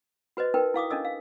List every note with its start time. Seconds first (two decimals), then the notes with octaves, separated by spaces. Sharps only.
0.37 F#4 B4 C5 D#5
0.54 D#4 A#4 B4 G5
0.74 E4 F5 D6 D#6
0.90 C#4 D4 A4 D#5 E6
1.05 F5